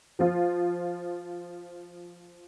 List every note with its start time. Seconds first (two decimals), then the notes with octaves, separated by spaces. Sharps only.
0.19 F3 F4